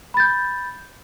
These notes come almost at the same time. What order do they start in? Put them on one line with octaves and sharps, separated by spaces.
B5 A6 G6